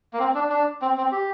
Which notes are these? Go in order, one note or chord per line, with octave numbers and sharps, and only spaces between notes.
A#3
C4
D4
D4
C4
C4
G4